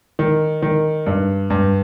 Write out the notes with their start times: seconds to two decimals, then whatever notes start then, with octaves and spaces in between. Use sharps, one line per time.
0.19 D#3
0.62 D#3
1.06 G2
1.50 G2